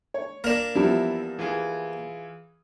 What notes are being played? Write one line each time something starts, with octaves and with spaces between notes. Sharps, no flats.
C#5
A#3 D4 F6 A#6 F7
E2 F3 G3 E4
E3 F4 G#4